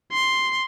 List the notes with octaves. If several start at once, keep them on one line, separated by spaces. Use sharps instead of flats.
C6